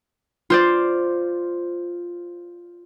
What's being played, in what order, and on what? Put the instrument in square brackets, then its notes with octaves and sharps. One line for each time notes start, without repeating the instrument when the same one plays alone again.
[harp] F4 C5 D5